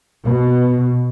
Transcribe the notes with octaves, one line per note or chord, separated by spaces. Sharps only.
B2